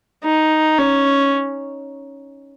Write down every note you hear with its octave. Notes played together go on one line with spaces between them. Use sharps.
D#4
C#4